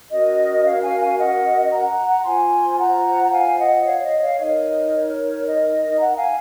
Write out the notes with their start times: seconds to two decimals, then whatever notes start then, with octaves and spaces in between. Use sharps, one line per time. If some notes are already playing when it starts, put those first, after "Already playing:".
0.10 C#4 F#4 A#4 C#5 D#5
0.64 C#5 F5
0.82 F5 G#5
0.99 F5 G#5
1.17 D#5 F#5
1.71 F#5 A#5
2.24 F4 C5 G#5 C6
2.78 F#5 A#5
3.27 A#5
3.31 F5 G#5
3.58 D#5 F#5
3.85 C#5 F5
4.02 D#5
4.21 C#5 F5
4.39 D#4 A#4 C#5 D#5
4.92 C#5
5.45 D#5
5.99 F#5 A#5
6.16 F5 G#5